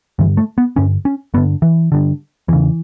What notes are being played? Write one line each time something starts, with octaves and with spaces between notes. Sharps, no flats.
G2 D3 E3
A3
B3
G2 D3 C#4
C#4
G2 D3 B3
E3
G2 D3
E2 C#3 E3